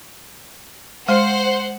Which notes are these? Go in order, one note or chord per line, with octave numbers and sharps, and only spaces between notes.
G#3 C5 F#5